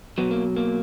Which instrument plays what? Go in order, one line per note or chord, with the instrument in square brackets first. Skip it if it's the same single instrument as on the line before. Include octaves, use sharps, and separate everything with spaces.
[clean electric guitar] B2 F#3 B3
A#3
A#3